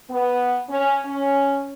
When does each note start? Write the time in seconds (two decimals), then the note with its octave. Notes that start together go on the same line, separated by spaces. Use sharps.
0.10 B3
0.68 C#4
1.05 C#4